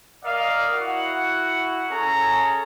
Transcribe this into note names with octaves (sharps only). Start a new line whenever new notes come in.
A#4 D5 D#5 F5
E4 F#4 F#5
C#4 G#4 A4 C#5 A#5